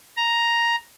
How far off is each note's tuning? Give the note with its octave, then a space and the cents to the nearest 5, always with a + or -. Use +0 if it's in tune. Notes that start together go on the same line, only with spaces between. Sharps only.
A#5 +5